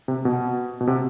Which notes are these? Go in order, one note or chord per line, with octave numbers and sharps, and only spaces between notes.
C3
B2
B2
C3